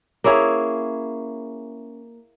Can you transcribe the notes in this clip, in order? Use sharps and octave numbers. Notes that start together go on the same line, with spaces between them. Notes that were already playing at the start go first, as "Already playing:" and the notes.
A#3 C#4 E4 G#4